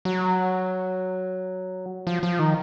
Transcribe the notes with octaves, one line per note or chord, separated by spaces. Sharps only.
F#3
F3
F3
D#3